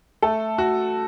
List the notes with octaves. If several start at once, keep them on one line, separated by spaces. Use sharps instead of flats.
A3 A4
F#4